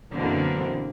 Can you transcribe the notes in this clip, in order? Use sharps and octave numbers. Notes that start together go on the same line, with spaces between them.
F#2 B2 D3 E3 A#3 C4